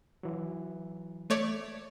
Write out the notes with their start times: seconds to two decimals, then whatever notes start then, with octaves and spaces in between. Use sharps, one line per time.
0.23 E3 F#3
1.30 A3 C#5 D5